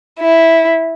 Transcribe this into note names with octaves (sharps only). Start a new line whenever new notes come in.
E4